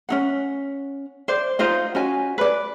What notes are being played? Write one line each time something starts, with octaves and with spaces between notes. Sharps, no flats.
C#4 D#4 F#5
C5 D5
D#4 F4 C5 D#5
C#4 F#4 D#5 G#5
B4 D5